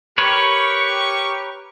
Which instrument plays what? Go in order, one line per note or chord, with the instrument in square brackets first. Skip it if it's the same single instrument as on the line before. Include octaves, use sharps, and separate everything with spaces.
[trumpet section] G4 C#6 [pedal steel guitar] A#4 B4 C#5